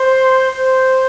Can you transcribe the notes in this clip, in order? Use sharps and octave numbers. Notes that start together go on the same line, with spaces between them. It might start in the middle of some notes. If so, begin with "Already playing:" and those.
Already playing: C5
C5